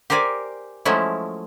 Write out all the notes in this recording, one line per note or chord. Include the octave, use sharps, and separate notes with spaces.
G4 A#4 C5 D5 G#5
F3 F#3 G#3 A3 C#4 E4